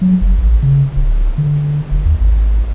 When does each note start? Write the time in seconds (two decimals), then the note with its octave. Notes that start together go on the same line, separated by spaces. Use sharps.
0.01 F#3
0.21 F1
0.38 A1
0.63 C#3
0.96 D1
1.38 D3
1.91 E1
2.05 D#2
2.19 G#1